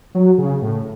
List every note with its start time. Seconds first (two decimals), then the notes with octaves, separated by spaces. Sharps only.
0.15 F#3
0.38 C#3
0.62 A2